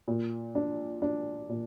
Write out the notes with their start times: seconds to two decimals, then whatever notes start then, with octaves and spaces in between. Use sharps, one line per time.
0.08 A#2
0.55 D4
1.02 D4
1.49 A#2